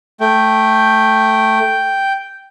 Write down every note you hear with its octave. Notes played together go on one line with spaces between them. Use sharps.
A3 G5